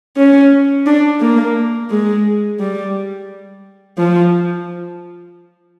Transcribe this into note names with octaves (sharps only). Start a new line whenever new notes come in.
C#4
D4
A#3
G#3
G3
F3